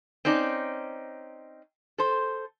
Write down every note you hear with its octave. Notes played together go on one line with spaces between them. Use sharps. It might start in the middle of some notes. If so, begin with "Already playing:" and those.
C4 C#4 D#4 D5
A4 C5